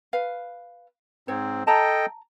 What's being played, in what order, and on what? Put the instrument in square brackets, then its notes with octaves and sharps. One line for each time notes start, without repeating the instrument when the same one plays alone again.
[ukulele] B4 F5
[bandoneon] G#2 C4 [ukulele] C5 C#5
[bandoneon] A4 D#5 G5 [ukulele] A5 A#5